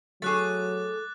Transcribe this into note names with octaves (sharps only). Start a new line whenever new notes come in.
F#3 A3 G#4 D6 F#6 A6